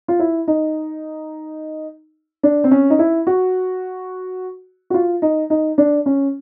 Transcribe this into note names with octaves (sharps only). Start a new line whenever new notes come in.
F4
E4
D#4
D4
C4
C#4
D#4
E4
F#4
F#4
F4
D#4
D#4
D4
C#4